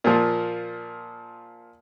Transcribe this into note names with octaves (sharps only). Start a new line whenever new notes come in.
A#2 F3